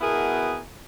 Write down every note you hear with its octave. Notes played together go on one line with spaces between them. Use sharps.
B2 B3 E4 G#4 A#4